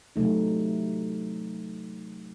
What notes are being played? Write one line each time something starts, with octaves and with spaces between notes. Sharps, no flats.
C3 F#3 A3 D#4